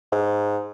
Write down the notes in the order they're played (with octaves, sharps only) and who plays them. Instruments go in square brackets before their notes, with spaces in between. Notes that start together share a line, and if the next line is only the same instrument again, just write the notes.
[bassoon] G#2